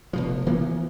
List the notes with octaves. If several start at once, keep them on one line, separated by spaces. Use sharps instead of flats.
F1 B2 F3
E3 A#3 B3